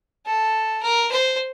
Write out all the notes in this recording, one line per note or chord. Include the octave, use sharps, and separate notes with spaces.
A4
A#4
C5